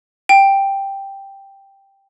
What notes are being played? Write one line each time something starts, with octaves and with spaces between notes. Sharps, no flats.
G5